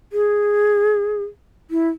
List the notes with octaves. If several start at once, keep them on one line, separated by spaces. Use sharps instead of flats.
G#4
E4